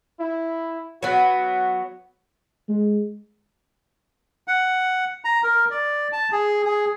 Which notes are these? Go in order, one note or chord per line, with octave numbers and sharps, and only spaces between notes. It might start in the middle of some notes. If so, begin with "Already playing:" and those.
E4
F#3 B3 F#4
G#3
F#5
A#5
A#4
D5
A5
G#4
G#4